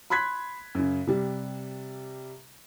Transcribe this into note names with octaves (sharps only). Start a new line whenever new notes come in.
B5 C6 F#6 G#6 B6
F#2 C#3
C3 G3